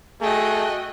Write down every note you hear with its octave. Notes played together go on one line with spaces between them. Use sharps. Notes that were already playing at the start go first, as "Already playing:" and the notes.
A3 F#4 G#4 D#5 G5